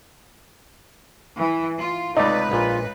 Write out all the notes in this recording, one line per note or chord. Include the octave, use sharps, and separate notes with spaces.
E3
F4
C#2 C3 A3 D#4 B4 D5
A#1 A#2 F4